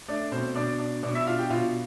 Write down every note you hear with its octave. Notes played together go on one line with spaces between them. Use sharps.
A3 D4 D5
B2 C4 C5
B2 D4 D5
D4
B2 D4 D5
E4 E5
D4 F4 F5
G4 G5
B2 F4 F5